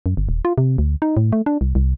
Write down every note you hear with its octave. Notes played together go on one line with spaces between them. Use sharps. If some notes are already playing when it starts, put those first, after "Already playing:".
F#2
G1
D#1
F4
C3
D2
D#4
A2
A3
D4
C2
C2